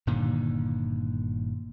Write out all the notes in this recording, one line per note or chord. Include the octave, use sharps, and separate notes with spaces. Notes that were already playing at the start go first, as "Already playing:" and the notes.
G1 A#2 D3 D#3